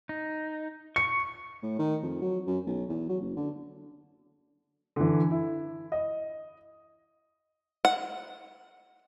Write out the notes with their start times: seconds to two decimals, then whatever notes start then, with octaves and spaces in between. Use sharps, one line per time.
0.09 D#4
0.96 C#6 C#7
1.63 A2
1.79 D#3
2.03 F2
2.22 F#3
2.47 F#2
2.66 B1
2.89 E2
3.09 F#3
3.21 F#1
3.37 D3
4.96 D3 E3
5.31 E4
5.92 D#5
7.85 F#5